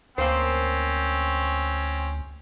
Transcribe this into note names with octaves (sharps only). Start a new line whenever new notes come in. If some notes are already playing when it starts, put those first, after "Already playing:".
D2 A#3 C4 C#4 C5